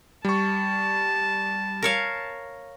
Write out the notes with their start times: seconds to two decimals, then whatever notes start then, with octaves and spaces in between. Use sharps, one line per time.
0.25 G3 A5 C#6
1.82 A#4 C#5 F5